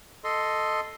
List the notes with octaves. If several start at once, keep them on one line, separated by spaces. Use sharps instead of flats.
A4 D#5 C6